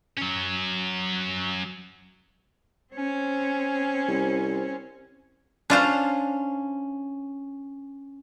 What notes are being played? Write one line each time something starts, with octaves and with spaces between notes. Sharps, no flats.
F#3 C#4
C4 C#4
C2
C#4 D4 F4 C5